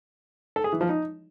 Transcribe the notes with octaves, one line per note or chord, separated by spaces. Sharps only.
A4
G#4
E3
F3
D#4